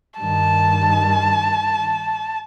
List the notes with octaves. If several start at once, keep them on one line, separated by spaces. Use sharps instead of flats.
G2 D#3 A5